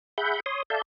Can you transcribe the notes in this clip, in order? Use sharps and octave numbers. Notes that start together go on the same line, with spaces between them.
G#4 E5 F#5 B5 G6
C#5 C6 D#6
A4 D5 E5 F5 A5 G6